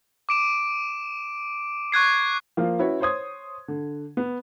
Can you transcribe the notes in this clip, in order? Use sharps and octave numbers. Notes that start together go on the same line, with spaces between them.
D6 D7 E7
C#6 F#6 G#6 C7
F3 A#3 F4
C#4 E4 F#4 B4 C#5
C5 C#5 C6 D#6 G#6
D3
B3